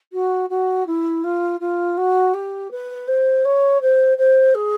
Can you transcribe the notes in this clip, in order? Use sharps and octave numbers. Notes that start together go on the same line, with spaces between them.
F#4
F#4
E4
F4
F4
F#4
G4
B4
C5
C#5
C5
C5
G#4